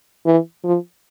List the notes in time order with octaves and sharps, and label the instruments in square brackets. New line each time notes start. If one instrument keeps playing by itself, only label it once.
[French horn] E3
F3